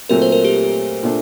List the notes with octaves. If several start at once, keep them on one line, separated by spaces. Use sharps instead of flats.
A#2 F#3 A3 C4 A#4
C5
A#4
G4
A#2 A3 D4